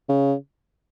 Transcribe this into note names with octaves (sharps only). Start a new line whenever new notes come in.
C#3